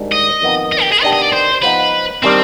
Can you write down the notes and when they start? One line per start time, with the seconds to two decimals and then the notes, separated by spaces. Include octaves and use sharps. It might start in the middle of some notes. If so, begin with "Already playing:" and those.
Already playing: G#2 D#3 G3 D4
0.12 D#5
0.42 F2 D#3 B3 D#4
0.72 D#5
0.81 G4
0.92 G#4
1.02 D#3 B3 D4 G4 D#5
1.13 D#5
1.21 D5
1.32 C5
1.62 F3 B3 D#4 B4
2.23 D#3 G3 C4 D4